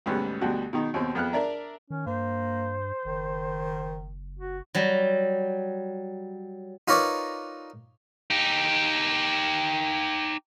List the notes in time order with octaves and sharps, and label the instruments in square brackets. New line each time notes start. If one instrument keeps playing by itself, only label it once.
[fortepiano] D2 G#2 B2 G3 B3 C#4
D2 B2 G3 D4 F#4
B2 D#3 D#4
D#2 B2 C4
F2 B3 G5 F6 F#6
D4 A#4 D5 E5 A#5
[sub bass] D#3 [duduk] C#4
[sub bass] G2 [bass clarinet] A#3 [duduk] C5
[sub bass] F#1 [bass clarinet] D#3
[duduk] F#4
[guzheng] F#3 G3
[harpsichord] D#4 F4 A#4 B4 C#5 D5
[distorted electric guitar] D#4 G4